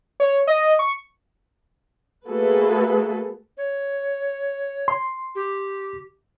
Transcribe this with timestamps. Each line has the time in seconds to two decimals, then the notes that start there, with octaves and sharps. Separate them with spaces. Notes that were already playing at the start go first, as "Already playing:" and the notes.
0.20 C#5
0.47 D#5
0.79 C#6
2.28 A3 A#3 F#4 G#4 A4 B4
3.58 C#5
4.88 C6
5.35 G4